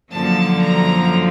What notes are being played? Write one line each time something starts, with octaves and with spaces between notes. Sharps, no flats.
F#2 D3 F3 A#3 A5
A#5